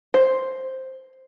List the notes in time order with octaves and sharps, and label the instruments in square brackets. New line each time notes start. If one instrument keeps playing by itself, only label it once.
[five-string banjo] C5